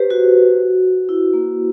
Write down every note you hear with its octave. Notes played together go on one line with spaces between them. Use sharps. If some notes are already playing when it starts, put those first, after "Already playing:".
Already playing: G4 B4 C5
F#4
E4
A#3